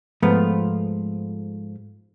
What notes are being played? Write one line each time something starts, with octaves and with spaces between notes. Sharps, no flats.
G#2 F3 A3 B3 F4